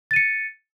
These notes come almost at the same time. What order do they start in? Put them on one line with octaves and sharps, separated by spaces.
A6 D#7 C#7